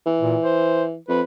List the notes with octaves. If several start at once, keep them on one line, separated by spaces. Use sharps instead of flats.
E3
A#2
C5
F2 B4